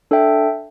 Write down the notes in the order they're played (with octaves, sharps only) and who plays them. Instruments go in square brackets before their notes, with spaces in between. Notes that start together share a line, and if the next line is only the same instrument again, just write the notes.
[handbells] D4 A4 E5 G5